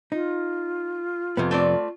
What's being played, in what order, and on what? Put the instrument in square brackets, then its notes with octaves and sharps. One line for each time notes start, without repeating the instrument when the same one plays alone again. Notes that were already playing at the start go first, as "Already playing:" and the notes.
[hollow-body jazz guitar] D#4 [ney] F4
[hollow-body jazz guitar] F2 C3 B3
[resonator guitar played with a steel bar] A3 C4 D5